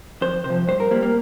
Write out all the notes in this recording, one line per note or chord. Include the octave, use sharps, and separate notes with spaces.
F2 C5
C3 C5
F3
G2 C5
A#4
G3 A#3
A#3